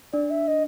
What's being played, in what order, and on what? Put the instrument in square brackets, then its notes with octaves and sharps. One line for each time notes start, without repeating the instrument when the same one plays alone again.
[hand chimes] D4 [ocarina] D5
[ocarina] E5
D#5